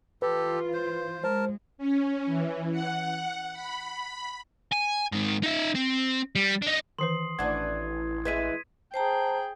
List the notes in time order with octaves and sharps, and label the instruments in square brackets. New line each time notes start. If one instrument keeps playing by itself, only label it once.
[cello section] E3 F4 [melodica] G4 A4 [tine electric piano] B4
[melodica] C5
[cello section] G#3 [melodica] A#4 A5 [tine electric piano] C5
[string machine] C#4
E3
F#5
B5
[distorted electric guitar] G#5
G#2 D#3
D#4 E5
C4
G3
D4 D#4
[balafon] D#3 E3 B4 [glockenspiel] C6 D#6 C7
[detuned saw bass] A1 [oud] E3 D4 [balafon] F#5 [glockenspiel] G#6 C7
[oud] E3 G#3 E4 [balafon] B4 [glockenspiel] G#6 B6 D#7
[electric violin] G#4 G5 [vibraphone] C5 A5 A#5